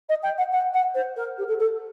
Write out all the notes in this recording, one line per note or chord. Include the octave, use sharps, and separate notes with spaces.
D#5
G5
F#5
F#5
F#5
C5
A#4
G4
A4
A4